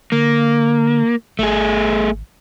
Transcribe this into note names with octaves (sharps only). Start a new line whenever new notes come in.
D3 A#3
G#1 A3 G#4